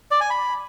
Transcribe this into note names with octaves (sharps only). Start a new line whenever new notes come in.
D5
G#5
B5